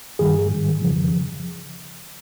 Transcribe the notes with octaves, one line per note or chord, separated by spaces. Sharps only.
G2 D#3 G3 G#4
G#2 D#3 G3
F2 C#3 F3